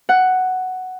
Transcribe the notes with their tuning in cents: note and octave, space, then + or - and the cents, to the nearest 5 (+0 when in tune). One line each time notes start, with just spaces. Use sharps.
F#5 +5